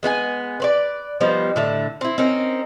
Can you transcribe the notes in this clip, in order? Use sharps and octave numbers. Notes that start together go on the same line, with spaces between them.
G#3 B3 E4 G#5
B4 C5 D5
F3 G3 B3 D#4
A2 D3 E5
C4 E4
C4 C#4 D#4 A#4